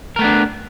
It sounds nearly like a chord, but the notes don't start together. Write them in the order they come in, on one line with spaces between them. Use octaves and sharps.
A#4 A3 B3 D4